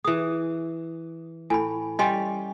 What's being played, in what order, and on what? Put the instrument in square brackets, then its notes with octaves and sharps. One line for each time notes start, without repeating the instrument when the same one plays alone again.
[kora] E3 G#4 [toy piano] D#6
[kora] A2 [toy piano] G#5 B5
[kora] G3 C#4 [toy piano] D#5 G#5 C6